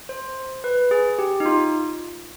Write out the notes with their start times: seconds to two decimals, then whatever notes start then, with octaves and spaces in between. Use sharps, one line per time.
0.09 C5
0.64 B4
0.91 G#4
1.19 G4
1.40 D#4
1.46 F4